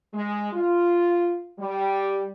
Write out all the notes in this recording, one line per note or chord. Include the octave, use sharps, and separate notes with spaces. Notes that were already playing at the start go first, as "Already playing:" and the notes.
G#3
F4
G3